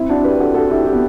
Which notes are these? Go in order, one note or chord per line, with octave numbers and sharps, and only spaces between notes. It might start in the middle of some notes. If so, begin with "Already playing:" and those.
Already playing: C4 E4
D4 F#4
G4 B4
F#4 A4
F#4 A4
E4 G4
E4 G4
B3